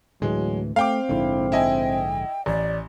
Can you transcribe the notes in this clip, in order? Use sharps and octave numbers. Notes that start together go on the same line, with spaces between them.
D2 A2 E3 F#3 G#3
A3 C4 F5 G5 D6
A#1 G#2 D3 E4
E4 D#5 G5 G#5
A1 D5